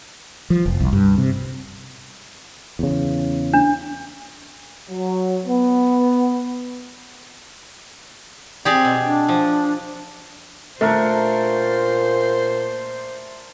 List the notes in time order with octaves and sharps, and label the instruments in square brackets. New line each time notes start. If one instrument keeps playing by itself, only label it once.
[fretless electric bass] F3
F1
C2
G2
C3
E2 C#3
[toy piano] D4
[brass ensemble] F#3
B3
[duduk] C4 [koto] G4 G#4 D5
[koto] B2
[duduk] D4
[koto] F3
[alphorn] A#2 [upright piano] A3 [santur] D4 A#4 C#6 [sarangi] C5